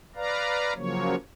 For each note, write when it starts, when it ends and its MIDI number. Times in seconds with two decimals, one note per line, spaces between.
0.16 0.74 71
0.16 0.74 74
0.16 0.74 77
0.16 0.74 82
0.76 1.15 49
0.76 1.15 53
0.76 1.15 54
0.76 1.15 58
0.76 1.15 73